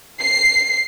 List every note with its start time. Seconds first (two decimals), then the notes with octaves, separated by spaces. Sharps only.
0.20 C7